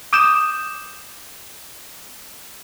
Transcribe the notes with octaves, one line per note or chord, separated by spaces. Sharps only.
D6 D#6 G6 E7